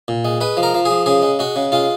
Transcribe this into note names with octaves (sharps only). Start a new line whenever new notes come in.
A#2
G#3
G#3 B4
F3
A#4
F3
G#4
F3
C#3 G#4
G#3
G#3 F#4
C#3
G#3 F4